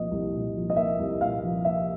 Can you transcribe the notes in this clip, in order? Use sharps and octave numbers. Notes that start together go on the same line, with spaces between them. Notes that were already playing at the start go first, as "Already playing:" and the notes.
Already playing: C2 A#2 F3 A#3 D#5
C2
A#2
F3
D#5
A#3 E5
C2
A#2 F5
F3
A#3 E5